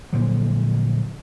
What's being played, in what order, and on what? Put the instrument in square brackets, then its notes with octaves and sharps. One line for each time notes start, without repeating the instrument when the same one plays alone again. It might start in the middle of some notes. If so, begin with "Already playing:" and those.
[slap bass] A#2 D3 F3 F#3